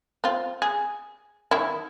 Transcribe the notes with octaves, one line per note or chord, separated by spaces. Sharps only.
C4 F4
G#4
D#3 E4